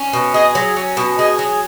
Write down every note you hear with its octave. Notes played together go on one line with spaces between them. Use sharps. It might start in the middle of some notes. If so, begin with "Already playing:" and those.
Already playing: C#4
B2
G#4 D#5
F#3
C#4
B2
G#4 D#5
F#3